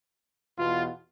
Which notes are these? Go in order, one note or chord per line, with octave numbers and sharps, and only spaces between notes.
E2 B2 F4